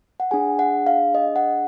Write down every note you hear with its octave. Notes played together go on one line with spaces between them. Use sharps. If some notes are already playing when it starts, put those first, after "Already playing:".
F#5
D4 G#4 G#5
F#5
F5
D#5
F#5